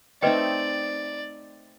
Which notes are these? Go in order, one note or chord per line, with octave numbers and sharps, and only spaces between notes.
A3 C4 D#4 B4 D5 D#5 G5